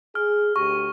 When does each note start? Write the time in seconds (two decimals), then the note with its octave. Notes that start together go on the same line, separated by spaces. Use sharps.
0.15 G#4 F6
0.56 D2 G4 C#6